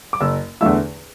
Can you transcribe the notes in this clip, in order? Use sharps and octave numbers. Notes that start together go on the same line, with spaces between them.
D6
F#1 E6
E2 D3 A3 E4 E6